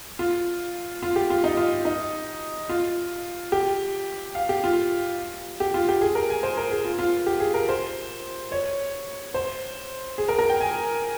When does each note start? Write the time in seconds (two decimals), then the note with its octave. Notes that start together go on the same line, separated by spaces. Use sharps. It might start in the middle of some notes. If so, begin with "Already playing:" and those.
0.19 F4
1.03 F4
1.16 G4
1.30 F4
1.44 D#4
1.57 F4
1.85 D#4
2.69 F4
3.52 G4
4.35 F5
4.49 G4
4.64 F4
5.60 G4
5.74 F4
5.88 G4
6.01 G#4
6.15 A#4
6.30 G#5
6.43 C5
6.57 A#4
6.71 G#4
6.85 F4
6.99 F4
7.26 G4
7.40 G#4
7.54 A#4
7.69 C5
8.52 C#5
9.34 C5
10.18 G#4
10.28 A#4
10.38 A#4
10.49 G5
10.60 G#5